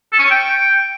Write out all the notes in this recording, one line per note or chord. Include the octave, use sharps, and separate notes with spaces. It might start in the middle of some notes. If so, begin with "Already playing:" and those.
A4
C#4
C#5
G5